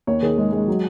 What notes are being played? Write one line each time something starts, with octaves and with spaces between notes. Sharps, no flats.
D#2 C#5
D#3 G#4
G#3
G#3
F#3